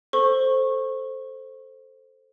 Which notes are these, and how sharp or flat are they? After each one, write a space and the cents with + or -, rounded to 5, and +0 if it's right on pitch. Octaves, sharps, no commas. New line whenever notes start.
A4 +0 C5 +0 C#6 -20